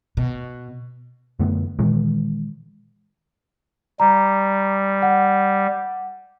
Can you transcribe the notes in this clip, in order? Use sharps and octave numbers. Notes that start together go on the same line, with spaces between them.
B2
F#2 D3 A3 B3
A#2 D#3 E3 G#3
G3 A#5
F#5